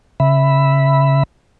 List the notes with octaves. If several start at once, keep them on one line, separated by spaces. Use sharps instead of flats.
C#3 E5 B5